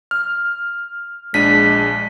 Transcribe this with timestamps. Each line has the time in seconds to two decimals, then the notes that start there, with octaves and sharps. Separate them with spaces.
0.11 F6
1.34 A#1 G#3 D4 B6 D#7